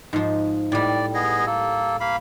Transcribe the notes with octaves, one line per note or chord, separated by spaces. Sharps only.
G#2 F3
A2 G3 D5
B3 G#4 D#5
A#3 A4
A#3 F5 B5